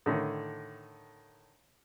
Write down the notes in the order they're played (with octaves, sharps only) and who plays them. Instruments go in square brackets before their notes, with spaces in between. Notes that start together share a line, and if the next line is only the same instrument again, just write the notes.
[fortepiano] A2 D3 D#3